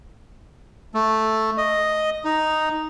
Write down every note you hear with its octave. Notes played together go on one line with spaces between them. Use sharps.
A3
D#5
D#4